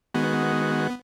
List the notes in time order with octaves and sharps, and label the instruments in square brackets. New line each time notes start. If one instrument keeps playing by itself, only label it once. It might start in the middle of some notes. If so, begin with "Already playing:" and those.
[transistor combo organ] D#3 G#3 F#4 [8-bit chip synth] B3